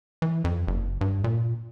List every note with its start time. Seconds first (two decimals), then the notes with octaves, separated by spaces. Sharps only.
0.22 E3
0.44 F2
0.67 F#1
1.01 G2
1.24 A#2